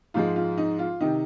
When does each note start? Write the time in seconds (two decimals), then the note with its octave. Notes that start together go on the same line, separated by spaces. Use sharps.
0.14 G#2 F3 G#3 F4
0.36 F4
0.58 D#4
0.79 F4
1.00 C3 D#3 D#4